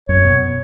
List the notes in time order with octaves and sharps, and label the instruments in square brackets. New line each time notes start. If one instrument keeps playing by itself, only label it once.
[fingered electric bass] F#2 [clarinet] C#5
[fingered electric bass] B2